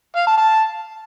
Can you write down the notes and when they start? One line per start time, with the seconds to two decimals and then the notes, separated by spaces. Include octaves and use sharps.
0.16 F5
0.27 A5
0.38 A5